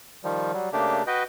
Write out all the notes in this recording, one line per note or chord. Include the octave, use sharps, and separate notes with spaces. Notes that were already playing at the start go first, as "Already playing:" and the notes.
D#3 F3 G3
F#3 G3
C#3 A3 A#3 D4 G4
F#4 B4 D#5 G5